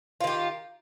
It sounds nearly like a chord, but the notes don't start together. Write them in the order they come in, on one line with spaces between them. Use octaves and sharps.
F4 D#3 G4